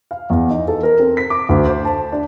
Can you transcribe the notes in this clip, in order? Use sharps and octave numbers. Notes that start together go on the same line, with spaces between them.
F5
E2
D#4
A4
A#4
C4
B6
D6
D2
C5
A5
D4